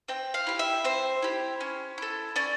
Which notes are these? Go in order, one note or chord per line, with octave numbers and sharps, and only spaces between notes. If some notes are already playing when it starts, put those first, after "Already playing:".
C4 G5
F5
E4 G4
E5
C4 C5
E4 G4
C#4
E4 A4
C#4 D5